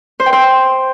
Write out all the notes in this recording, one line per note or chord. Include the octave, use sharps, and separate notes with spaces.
C5
G5
C5